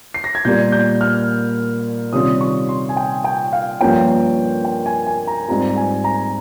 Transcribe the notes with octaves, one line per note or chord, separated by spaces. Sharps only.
C7
A#6
G#6
A#2 G3 A#3 G6
G6
F6
C3 D#3 G3 C#4 F4 D#6
C#6
C6
G#5
G5
G5
F5
G2 F3 A#3 C#4 G5
G5
G#5
G#5
A#5
G#2 G3 C4 F4 A#5
G#5
A#5